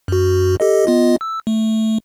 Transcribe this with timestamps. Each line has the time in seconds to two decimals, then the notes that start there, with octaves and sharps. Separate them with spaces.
0.08 F#2 F#4
0.60 G4 A4 D#5
0.86 B3 F4 D#5
1.21 E6
1.47 A3